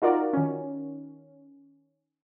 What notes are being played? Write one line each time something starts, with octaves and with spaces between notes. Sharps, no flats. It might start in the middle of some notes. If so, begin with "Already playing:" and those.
D#4 F4 F#4 A#4 D5
D#3 C#4